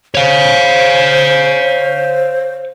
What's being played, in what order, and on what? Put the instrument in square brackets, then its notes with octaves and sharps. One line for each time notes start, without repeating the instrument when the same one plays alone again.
[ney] C5 [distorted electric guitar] C#5 F5